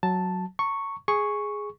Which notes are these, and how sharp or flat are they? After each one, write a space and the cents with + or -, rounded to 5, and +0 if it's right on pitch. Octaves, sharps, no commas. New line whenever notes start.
F#3 +0 A5 +0
A#5 -45 C#6 +0
G#4 +0 C#6 +0